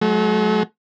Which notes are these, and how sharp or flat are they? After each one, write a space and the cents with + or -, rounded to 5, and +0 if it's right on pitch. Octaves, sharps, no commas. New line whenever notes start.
F#3 +0 A3 -45